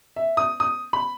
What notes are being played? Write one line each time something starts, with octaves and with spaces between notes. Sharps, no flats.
E5
D#6
D#6
B5